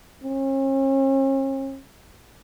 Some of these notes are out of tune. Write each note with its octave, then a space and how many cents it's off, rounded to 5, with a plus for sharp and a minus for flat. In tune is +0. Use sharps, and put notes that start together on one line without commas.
C#4 -45